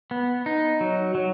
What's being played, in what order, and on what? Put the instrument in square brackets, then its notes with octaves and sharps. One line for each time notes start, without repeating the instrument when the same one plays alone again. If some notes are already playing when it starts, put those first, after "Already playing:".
[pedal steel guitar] B3
D#4
F#3
F#3